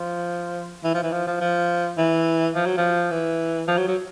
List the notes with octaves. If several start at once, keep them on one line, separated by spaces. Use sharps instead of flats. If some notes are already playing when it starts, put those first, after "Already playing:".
Already playing: F3
E3
F3
E3
F3
F3
F3
E3
F3
F#3
F3
E3
F3
F#3
F#3